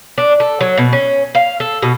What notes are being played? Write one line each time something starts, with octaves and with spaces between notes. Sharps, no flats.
D4
A4
F#3
B2
C#4
F5
A4
B2